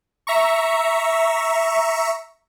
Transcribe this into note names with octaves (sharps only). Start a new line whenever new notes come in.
E5 A#5 C#6